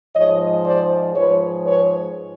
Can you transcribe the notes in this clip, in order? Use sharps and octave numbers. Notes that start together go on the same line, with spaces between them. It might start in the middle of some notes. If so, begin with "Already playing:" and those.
G#2 F3 G#3 C#5 D#5
C5 D5
G#2 F3 G#3 B4 C#5
B4 C#5